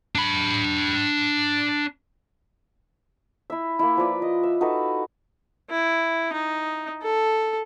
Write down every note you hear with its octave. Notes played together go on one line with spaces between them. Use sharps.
D4 B5
E4 E5
A#3 E4
F3 B4 D5 B5
D#5
E5
D#4 F#4 A4 B4
E4
D#4
A4